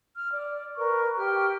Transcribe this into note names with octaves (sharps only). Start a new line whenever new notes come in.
F6
D5
A#4 B4 C#6
G4 G5 F6